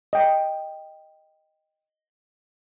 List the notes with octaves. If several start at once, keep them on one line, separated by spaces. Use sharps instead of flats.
D#5 G5